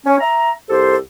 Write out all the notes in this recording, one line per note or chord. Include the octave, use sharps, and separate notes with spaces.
C#4
E5 A#5
C2 G4 A4 C5